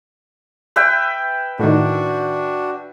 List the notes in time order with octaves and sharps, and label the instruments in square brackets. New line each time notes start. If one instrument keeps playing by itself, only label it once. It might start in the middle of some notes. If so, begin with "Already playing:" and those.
[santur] B4 E5 G5
[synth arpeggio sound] A2 D#3 [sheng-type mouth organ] D4 F#4